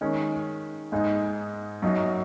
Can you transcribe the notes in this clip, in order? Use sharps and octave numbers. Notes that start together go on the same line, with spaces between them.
D#3 G#3 C#4
G#2 G#3 D#4
F#2 F#3 D#4